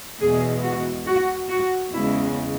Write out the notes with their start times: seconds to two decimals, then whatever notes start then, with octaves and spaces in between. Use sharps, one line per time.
0.20 E2 B2 G#3 G#4
0.63 F#4
1.06 F#4
1.50 F#4
1.93 E2 C#3 G#3 E4